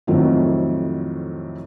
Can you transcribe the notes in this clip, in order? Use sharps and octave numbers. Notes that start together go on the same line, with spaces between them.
F2 A2 D#3 F#3 A3 C4